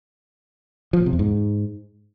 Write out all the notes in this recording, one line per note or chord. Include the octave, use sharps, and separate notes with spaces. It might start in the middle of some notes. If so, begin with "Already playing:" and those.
F3
A#2
C3
E2
G#2